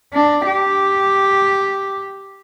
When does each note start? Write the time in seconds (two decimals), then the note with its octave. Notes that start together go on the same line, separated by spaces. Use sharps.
0.13 D4
0.47 G4